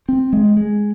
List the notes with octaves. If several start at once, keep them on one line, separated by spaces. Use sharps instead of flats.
C4
G#3
G#3